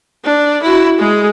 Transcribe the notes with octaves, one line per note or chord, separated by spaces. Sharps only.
D4
E4 F#4
G#3 G#4